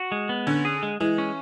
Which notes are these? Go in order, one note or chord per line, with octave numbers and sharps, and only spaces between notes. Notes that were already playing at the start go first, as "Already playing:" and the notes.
Already playing: F#4
G#3
B3
D3 C#4
G#4
G#3
E3 G#3
C#4